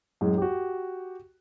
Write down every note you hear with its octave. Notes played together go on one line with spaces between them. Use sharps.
F#2 A2 G#3
F#4 G4